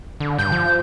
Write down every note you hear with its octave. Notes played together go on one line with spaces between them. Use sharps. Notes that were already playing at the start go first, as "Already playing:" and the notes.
D3
G2 G6
F3